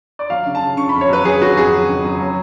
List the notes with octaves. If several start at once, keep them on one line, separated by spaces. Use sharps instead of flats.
D5
F#3 F5
C#3
A5
C#3
C#3 C#6
B5
F2
C#5
F#3 B4
F#3 G#4
F#3 F#4
F2 G#4
F#3
C#3
F#3
F#3